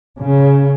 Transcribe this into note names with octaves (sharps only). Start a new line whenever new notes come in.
C#3